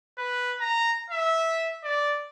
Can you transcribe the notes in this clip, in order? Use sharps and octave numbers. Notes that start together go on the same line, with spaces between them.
B4
A#5
E5
D5